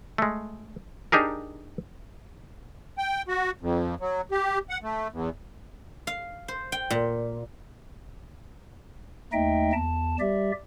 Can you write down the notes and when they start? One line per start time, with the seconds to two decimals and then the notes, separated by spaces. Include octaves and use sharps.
0.18 G#3 A3
1.12 D4 D#4 G4 G#4 A#4
2.98 G5
3.28 F#4
3.61 F2
4.00 F#3
4.31 G4
4.70 F#5
4.83 A3
5.12 E2
6.07 F5
6.48 C5
6.72 G5
6.90 A#2
9.33 D#2 A3 D#4 D#5 E5 G5
9.73 E2 A5
10.20 G3 G4 D5 E5